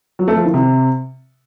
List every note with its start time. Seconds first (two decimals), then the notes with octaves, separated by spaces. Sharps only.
0.19 F#3
0.28 A3
0.36 F3
0.45 D#3
0.54 C3